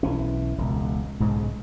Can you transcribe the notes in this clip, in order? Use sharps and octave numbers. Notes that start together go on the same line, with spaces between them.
B1 E3 C#4
E1 C#2
B1 G#2 C#3 G#3